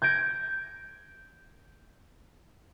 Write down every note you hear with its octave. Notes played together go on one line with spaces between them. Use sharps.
G6 G#6 A#6 D7